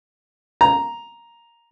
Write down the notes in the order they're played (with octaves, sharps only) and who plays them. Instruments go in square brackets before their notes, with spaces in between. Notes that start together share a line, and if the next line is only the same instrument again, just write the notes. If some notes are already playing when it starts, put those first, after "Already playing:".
[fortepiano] A#5